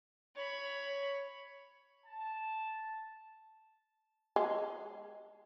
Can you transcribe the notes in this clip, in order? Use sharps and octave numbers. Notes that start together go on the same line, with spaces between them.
C#5 B5
A5
G#3